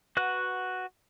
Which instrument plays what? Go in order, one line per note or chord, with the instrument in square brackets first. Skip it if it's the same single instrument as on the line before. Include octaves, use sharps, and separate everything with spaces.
[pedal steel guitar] F#4 B4 F#5 F#6